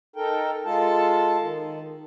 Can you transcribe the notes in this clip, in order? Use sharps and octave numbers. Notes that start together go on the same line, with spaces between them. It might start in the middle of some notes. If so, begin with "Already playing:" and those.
D#4 A4 A#4 G5
G#3 F4 A4 A5
D#3